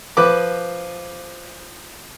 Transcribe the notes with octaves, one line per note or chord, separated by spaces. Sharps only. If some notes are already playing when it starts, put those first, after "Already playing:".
F3 B4 D6